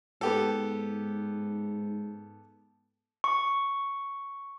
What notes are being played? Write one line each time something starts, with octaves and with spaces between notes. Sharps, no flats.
G#2 B3 G4 A4
C#6